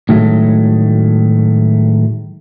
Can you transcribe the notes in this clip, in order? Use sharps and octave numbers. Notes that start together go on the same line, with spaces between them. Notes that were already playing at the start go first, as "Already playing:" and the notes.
A2 D#3 F#3 G#3 A3